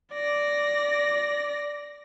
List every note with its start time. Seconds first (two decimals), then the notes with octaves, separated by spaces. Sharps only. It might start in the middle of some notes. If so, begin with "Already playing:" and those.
0.14 D5 A#6